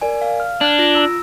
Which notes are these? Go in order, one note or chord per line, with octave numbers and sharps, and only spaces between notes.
A#4 D5 G#5
F5
F6
D4 F#6 G#6
F4 A#6 D7
A#5 E6